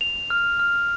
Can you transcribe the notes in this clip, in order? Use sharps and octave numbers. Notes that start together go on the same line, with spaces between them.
F7
F6
F6